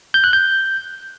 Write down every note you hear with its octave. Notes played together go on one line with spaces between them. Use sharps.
G6
F#6
G6